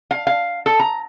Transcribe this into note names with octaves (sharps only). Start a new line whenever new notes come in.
F5
F5
A4
A#5